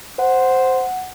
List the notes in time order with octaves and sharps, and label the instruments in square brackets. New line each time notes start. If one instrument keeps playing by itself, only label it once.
[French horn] C5 [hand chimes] F#5